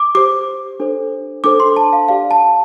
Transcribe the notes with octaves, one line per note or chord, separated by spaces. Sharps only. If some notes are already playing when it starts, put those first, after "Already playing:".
Already playing: D6
G4 C5 D6
D4 A4 C5
D4 A4 C5 D6
C6
A5
F5
G4 D5 F5
A5